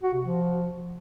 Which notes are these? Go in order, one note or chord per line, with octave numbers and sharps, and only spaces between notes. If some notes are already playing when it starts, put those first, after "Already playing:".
F#4
C3
F3